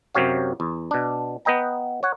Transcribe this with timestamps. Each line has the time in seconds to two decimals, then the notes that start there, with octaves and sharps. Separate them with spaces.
0.15 F#2 C3 F#3 G4 C#5 F5
0.60 E2
0.91 B2 D4
1.45 B3 B4 D#5 G5 A#5
2.03 C#5 F#5